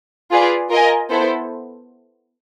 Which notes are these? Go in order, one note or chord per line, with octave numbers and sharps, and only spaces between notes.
F4 G#4 B4 D5
F4 A#4 D#5 G#5
B3 E4 A4 C5